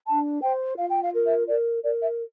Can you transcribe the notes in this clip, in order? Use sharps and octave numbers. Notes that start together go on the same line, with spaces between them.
D4 A5
C5 G5
F4 F5
G5
F5
A#4
E5
A#4 D5
A#4 D5
E5